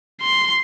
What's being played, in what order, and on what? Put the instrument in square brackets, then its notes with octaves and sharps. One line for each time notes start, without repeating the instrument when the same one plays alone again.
[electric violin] C6